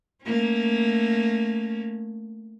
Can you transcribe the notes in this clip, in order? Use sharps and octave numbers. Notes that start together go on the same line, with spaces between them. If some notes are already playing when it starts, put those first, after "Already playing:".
A3 A#3 C#4